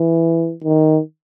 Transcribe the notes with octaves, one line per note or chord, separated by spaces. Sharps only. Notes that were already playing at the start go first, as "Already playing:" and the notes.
Already playing: E3
D#3